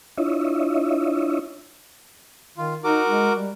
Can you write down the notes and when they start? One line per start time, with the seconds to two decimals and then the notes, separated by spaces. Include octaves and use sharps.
0.17 D4 E4 F4 C#5 D#5 E5
2.58 D#3 F4
2.84 D#4 F#4 A#4 D6
3.08 G#3
3.36 G3